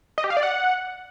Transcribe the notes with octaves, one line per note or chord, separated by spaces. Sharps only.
D#5
G4
F5
D5
F#5